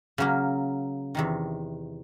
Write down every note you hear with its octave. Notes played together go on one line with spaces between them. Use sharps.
C#3 F#3 A#3
E2 C3 D#3